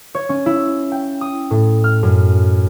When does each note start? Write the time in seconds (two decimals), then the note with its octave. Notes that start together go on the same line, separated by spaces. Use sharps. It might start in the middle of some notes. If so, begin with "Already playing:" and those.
0.15 C#5
0.29 C#4
0.46 E4
0.92 G5
1.21 D#6
1.51 A2
1.84 F6
2.03 F#2